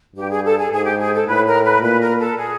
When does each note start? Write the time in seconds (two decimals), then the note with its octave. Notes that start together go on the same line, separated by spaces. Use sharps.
0.16 G2 G4
0.29 G#4
0.44 A4
0.57 G#4
0.71 G#2 G#4
0.84 G4
0.99 G#4
1.13 A4
1.27 A2 B4
1.45 A#4
1.63 B4
1.81 A#2 B4
2.00 A#4
2.19 A4
2.37 G#4